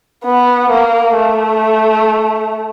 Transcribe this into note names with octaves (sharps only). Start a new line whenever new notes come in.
B3
A#3
A3